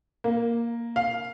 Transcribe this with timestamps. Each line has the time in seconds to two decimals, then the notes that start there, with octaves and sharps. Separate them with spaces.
0.24 A#3
0.96 F5